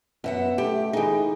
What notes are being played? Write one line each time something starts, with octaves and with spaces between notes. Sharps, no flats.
F#2 B3 E5 F#5
A3 G4
E3 D#4 G#4